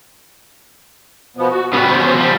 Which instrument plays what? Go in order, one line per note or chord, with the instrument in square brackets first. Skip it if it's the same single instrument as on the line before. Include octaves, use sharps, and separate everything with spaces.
[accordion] B2 F3 B3
F#4
[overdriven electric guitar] C#3 B3 [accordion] G3 F#4 B4
[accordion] C5
[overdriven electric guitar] F3 G3